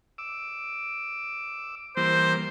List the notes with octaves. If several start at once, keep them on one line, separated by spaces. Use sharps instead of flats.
D6 E6
E3 G3 A#3 C5